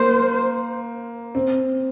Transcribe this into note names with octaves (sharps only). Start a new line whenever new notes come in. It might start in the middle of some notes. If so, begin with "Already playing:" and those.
Already playing: A#3 C5
C4